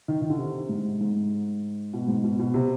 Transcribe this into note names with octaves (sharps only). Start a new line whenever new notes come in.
D#3
D#3
D3
C3
G#2
G#2
B2
G#2
B2
B2
C3